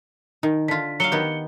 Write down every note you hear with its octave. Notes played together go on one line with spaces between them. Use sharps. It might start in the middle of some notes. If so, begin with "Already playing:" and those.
D#3 D#4
D3 F4 B6
F#3 F5 C#7 G7
D#3 B3 G4